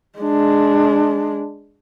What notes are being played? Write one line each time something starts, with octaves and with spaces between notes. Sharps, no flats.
G#3 D4